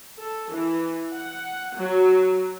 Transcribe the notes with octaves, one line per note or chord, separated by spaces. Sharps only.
A4
E3
F#5
F#3